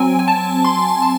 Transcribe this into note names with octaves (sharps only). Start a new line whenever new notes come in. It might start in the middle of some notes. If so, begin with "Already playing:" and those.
Already playing: F#3 C4 G#5
G#5
A5
C6
A5